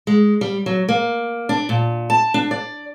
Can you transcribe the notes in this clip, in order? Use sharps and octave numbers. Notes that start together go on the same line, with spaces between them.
G#3
G3
F#3
A#3
D4
A#2
A5
D4
D5